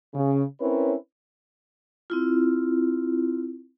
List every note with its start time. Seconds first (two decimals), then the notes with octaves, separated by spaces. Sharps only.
0.14 C#3
0.60 C4 C#4 E4 A#4 B4 C#5
2.10 C4 E4 F4